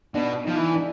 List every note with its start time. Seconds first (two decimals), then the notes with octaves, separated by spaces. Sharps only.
0.15 B2 D4
0.45 F3 D#4
0.55 E3
0.74 D4